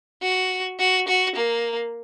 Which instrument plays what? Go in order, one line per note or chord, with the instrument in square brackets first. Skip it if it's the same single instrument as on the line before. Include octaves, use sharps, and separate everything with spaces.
[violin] F#4
F#4
F#4
A#3